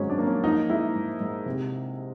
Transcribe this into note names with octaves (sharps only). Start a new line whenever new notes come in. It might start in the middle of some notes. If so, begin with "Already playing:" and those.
Already playing: G#2 D#3 F#3 C#4
D4
A#3
C#4
F3 D#4
G#3 E4
G#2
G#2
C3